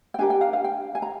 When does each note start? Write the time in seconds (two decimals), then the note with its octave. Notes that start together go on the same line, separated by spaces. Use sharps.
0.14 G5
0.19 D4 G4 A#4 G#5
0.30 G5
0.41 F5
0.53 F5
0.64 G5
0.95 G#5
1.02 A#5